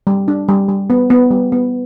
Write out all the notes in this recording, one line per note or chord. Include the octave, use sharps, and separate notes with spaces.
G3
D4
G3
G3
B3
B3
G3
B3